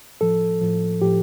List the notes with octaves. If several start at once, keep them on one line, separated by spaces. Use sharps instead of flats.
A2 F3 A4
A2 F3
A2 F3 G4